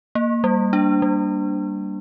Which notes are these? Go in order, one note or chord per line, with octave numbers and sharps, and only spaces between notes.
A#3
G3
D4
G3